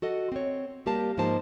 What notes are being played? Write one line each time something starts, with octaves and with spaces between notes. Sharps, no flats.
F#4 A4 D#5 F#5
C4 C#5
G3 A#3 G4 A#4 F5 A5
G#2 F3 A#3 D#4 C5 A5